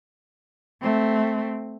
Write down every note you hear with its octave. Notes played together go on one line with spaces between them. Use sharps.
A3 C4